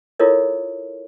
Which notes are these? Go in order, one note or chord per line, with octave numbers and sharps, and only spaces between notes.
E4 F4 A4 A#4 C#5 D#5